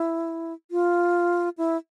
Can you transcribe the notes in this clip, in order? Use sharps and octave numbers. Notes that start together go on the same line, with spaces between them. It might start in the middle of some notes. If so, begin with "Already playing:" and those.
Already playing: E4
F4
E4